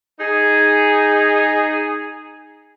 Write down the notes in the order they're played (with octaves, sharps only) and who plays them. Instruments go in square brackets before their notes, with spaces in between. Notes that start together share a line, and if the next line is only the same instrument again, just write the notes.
[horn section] D#4 G#4